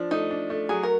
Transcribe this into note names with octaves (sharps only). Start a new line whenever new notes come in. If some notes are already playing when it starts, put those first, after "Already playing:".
Already playing: F3 D4
A3 D#4
D4
A3
F#3 G#4
A#4